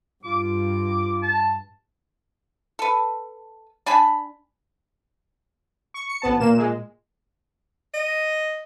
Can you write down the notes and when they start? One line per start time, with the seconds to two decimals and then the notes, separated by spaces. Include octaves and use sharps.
0.24 G2 F4 D6
1.23 A5
2.79 A4 B4
3.86 D4 G#5 A5 B5
5.94 C#6
6.09 C#7
6.22 A1 B3 A5
6.40 A#2 A#3 E7
6.57 A#2 G#3
7.94 D#5